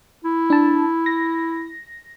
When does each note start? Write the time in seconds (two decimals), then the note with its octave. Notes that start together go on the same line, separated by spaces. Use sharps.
0.24 E4
0.50 D4 A5
1.06 A#6